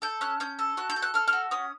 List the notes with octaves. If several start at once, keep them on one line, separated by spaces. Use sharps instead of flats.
A4 G6
C#4 F#6
C#4 G6
A4
F#4 F#6
G6
A4
F#6
A4 F6
F6
F#4
C#4 D#6